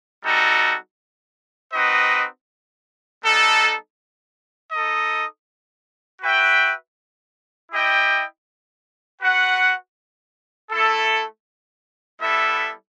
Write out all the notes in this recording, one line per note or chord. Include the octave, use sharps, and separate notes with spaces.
G3 C4 D#4 F#4 A4
C4 D#4 F#4 B4 D#5
G3 B3 D#4 A4
D#4 A4 D#5
F#4 B4 E5 G5
E4 G4 D#5 G5
F#4 B4 F#5
A3 E4 A4
G3 B3 E4 A4 E5